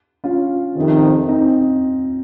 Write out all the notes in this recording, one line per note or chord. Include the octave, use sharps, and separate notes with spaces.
C#4 F4
F2 C3 D#3
C4 D#4